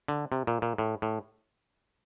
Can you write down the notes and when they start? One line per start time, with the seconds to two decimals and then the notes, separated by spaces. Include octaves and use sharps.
0.08 D3
0.32 C3
0.47 A#2
0.62 A#2
0.78 A2
1.02 A2